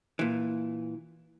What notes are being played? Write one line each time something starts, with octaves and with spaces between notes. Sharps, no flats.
A#2 E3